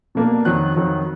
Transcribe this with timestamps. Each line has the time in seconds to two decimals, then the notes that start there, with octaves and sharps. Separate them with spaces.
0.15 B2 A#3 D4
0.45 F2 D#3 F#3 F#6
0.76 F2 D#3 F#3